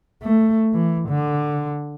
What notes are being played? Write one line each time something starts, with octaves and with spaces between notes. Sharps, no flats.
A3
E3
D3